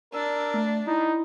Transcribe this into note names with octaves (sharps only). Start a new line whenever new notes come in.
D4 A#4 E6
A3
D#4 E4